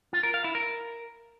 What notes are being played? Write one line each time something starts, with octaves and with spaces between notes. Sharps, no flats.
F4
A#4
F5
E4
A#4